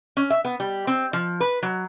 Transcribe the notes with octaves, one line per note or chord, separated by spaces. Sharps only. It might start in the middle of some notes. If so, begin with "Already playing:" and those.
C#4
E5
B3
G3
C4
F3
B4
F#3